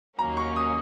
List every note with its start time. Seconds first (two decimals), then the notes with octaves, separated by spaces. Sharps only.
0.18 D#2 D#3 F#3 A#3 C#4 A#5
0.37 C#6
0.56 D#6